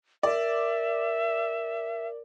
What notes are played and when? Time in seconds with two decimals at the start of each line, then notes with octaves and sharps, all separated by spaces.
0.23 A#4 D5 E5